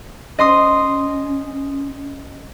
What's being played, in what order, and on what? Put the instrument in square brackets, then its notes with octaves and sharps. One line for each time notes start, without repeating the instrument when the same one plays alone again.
[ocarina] C#4 [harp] D#5 C6 D#6